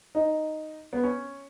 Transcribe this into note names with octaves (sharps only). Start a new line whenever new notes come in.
D#4
B3
C#4